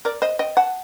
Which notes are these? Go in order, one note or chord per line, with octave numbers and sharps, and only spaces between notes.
A#4 D5
C5 D#5
D#5 G5
F#5 A5